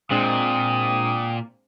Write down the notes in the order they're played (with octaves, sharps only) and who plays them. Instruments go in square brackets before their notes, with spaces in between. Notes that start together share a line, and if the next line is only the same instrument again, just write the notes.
[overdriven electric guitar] A#2 [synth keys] G#3 C4 D4 [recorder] G5 [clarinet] D#6